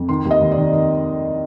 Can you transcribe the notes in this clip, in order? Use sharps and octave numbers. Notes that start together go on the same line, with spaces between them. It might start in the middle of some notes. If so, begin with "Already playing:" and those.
Already playing: F2
D#3 C6
D#2
D#5
D#2
D5
D#3
D#3